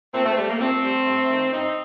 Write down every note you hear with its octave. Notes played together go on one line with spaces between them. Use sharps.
A#2 A3 C4
A3 C4
G3 A3
A#3
A#2 A3 C4
G3
G2
D#3 A3
G2 C4 D#4